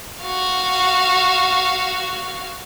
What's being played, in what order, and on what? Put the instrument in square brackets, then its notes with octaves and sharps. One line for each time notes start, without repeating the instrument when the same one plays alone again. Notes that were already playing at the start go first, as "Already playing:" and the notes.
[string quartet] F#4 F5